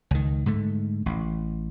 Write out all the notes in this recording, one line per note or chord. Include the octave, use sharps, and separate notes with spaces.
C#2 D#3
G#2 D3 A3
A1